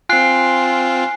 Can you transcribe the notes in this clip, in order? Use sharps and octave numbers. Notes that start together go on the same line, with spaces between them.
C4 F4 G#5 F#6 C7